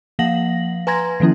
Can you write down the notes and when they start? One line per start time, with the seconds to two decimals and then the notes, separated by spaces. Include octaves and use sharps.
0.19 F3 A#3 F5 F#5 A#6 F#7
0.87 B4 G#5 A#5 C6 G#6 A#6
1.20 D#3 F3 A#3 C#4 E4